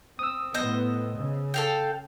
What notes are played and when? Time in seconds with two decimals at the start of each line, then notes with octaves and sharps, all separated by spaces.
0.19 C4 D#6 E6
0.54 A2 B3 C5 D#5
1.16 C#3
1.54 A4 F5 G5